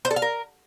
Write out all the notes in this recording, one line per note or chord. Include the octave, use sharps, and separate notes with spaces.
C5
A4
F5
A#4